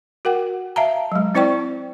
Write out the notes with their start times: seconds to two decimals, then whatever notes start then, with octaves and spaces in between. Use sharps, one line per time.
0.25 F#4 A#4 F#5 G5
0.76 E5 F5 A5 A#5
1.12 F#3 G#3
1.35 C4 E4 C5 D5 G5 C#6